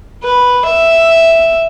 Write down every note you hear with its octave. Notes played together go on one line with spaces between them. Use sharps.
B4
E5